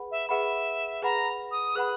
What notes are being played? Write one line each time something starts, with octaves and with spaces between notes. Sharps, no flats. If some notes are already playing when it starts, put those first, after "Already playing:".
Already playing: G#4 B4 F#5 B5
E5
G#4 B4 E5 F#5 B5
G#4 B4 F#5 A#5 B5
D#6
G#4 B4 F#5 B5 F#6